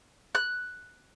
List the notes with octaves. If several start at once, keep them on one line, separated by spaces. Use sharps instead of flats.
F#6